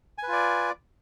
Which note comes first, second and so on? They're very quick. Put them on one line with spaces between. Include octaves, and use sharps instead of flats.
G#5 B4 F4 D5